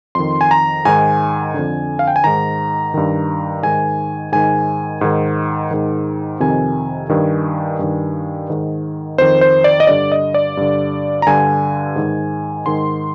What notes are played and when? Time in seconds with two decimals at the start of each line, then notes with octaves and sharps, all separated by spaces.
0.15 F2 D#3 C6
0.41 G#5
0.51 A#5
0.85 G#2 D#3 G#5
1.54 F2 D3
1.99 F5
2.08 G5
2.16 G#5
2.24 G#2 D#3 A#5
2.94 G2 D#3
3.63 G#2 D#3 G#5
4.32 G#2 D#3 G#5
5.01 G#2 D#3
5.71 G#2 D#3
6.40 F2 C3 D#3 G#5
7.09 G2 D#3
7.79 G2 D#3
8.50 G#2 D#3
9.18 F2 D#3 C5
9.41 C5
9.64 D5
9.80 D#5
9.87 G2 D3 D5
10.12 D#5
10.34 D5
10.57 G2 D3
11.22 A#5
11.27 G2 D3 G#5
11.96 G#2 D#3
12.66 G#2 D#3 C6